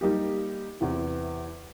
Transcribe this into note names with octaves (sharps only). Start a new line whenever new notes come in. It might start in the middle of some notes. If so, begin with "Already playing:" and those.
G3 A#3 D#4 G4
E2 C3 E3